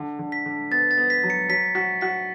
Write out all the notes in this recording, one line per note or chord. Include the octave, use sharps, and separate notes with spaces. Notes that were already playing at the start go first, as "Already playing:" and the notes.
Already playing: D3
D3
B6
D3
B3 A6
A6
B3
B6
F#3
C#7
F#3 B6
F#4 B6
F#4 B6